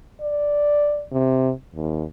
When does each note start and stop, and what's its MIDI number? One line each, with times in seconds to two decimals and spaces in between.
0.21 1.04 74
1.12 1.51 48
1.75 2.04 39